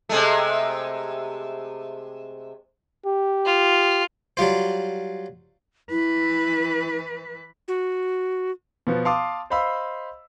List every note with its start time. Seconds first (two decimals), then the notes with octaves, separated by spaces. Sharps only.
0.09 C3 G#3 A3
3.06 G4
3.46 F4
4.37 F#3 G3 F4 C5
5.90 E3 E4 B4
7.68 F#4
8.87 B2 F3 B3
9.05 F5 A5 C6 D6 D#6
9.50 C5 D#5 F5 B5 C6 E6